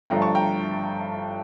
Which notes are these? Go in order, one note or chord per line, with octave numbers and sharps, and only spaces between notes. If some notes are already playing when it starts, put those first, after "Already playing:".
G1 G2 F3 A3 D4 G5 A#5
A5 C#6
G5 A#5